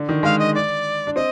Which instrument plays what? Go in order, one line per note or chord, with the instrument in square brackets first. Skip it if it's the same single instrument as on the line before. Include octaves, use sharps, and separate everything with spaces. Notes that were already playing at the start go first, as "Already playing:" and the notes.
Already playing: [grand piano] D3
D#3
[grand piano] G#3 [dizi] F5
[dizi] D#5
D5
[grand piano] D4
[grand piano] C4 [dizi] D#5